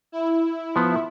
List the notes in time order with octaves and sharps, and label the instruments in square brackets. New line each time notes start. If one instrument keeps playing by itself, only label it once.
[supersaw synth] E4
[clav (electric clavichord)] F3 B3